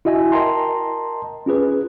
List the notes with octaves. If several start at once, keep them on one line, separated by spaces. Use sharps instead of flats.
E4 F#4 D#5 E5 G#5
A#4 D#5 G5 A5 A#5 C6
C#4 F4 G#4 B4